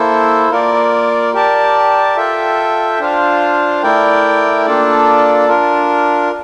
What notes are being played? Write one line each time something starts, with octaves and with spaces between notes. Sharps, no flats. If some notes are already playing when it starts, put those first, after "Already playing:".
Already playing: A#3 E4 A4 C5
A#3 F4 A#4 D5
G4 A#4 D5 A5
F4 A4 E5 G5
D4 F4 C5 F5
A3 E4 A#4 D5 G5
A#3 D4 F4 A4 D5
D4 F4 A#4